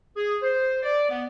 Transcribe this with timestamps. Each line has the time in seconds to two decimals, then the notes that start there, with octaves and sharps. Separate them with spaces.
0.17 G#4
0.43 C5
0.83 D5
1.10 B3